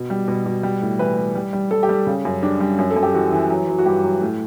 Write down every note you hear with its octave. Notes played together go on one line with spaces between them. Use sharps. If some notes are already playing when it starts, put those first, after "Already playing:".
Already playing: B2
G3
B2
B2
G3
A2
E3 B4
G3
G3
G3
G3 A4
G4
G3
C#3
F#2
G3 D4
G3
F#2
A4
F#2
G4
E3 F#4
E3
F#3
F#3
F#4
G2 G4
F#3
A2